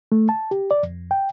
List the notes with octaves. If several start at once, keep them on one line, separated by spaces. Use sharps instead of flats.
A3
A5
G4
D5
F2
G5